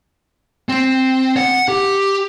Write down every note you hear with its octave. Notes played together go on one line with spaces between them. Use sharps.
C4
F#5
G4